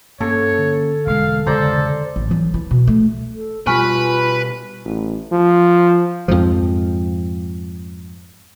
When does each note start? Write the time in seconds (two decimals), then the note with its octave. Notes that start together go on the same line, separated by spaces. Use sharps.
0.21 G2 A#3 C#4 A4 C#5
0.58 D3
1.07 E1 G#3 F5
1.46 E1 C#3 G#3 A4 C5 D5 A#5
2.16 A1
2.30 E3 F#3
2.54 E3
2.71 B2
2.87 A3
3.34 A4
3.67 B2 G3 F4 B4 G#5 C#6 F6
4.85 A1
5.31 F3
6.28 F2 G#2 F3